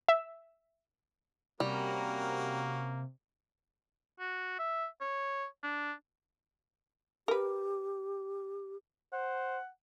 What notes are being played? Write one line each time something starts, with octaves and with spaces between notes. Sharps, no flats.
E5
C3 G3 A#3 C#4 F#4 A#4
F#4
E5
C#5
D4
G4 A#4 B4
C5 F#5